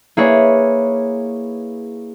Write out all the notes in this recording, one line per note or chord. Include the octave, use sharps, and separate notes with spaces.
A#3 E4 G#4 B4 C#5 D5